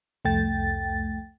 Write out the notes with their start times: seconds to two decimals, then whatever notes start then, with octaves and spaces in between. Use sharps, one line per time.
0.25 C2 F2 A3 G5 A6